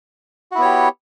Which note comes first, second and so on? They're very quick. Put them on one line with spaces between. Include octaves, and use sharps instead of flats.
F#4 E4 B3 C#5 G4